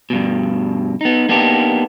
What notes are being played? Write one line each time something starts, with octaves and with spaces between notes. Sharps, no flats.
G2 B2
B3 D#4
A#3 B3 D4 D#4 G4